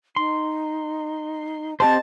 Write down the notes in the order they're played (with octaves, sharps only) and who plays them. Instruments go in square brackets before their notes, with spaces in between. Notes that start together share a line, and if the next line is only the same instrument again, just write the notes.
[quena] D#4 [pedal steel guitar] C6
[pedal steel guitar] C4 G4 C5 [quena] D#5 [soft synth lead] A5